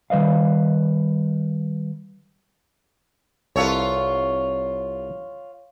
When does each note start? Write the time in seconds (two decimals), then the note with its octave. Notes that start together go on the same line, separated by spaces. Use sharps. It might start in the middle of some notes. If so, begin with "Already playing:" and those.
0.10 D#3 G3 B4 D#5 F5
3.56 C2 F4 A4 B4 C#5